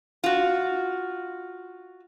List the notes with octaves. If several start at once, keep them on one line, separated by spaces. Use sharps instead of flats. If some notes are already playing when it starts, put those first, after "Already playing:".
F4 F#4